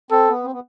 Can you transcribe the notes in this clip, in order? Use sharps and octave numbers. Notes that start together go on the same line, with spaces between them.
C4 A4
B3
C4
B3